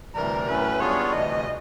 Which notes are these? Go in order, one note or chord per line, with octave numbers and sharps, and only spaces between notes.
D2 C3 E3 G3 A#4
A2 F#3 A3 C#4 B4
G3 B3 D4 F4 G#4 C#5
D2 C3 E3 D#5